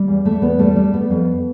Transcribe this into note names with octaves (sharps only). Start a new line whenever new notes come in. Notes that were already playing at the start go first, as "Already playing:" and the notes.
Already playing: G3
E2
E2 A3
E2 B3
G3 A3
G3
G3 B3
F2